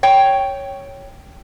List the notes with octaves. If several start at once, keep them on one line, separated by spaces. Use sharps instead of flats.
C#5 G5